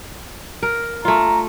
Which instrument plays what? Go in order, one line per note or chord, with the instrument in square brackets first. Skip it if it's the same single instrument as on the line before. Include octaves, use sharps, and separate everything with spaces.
[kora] A#4
[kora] A3 F4 [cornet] A#5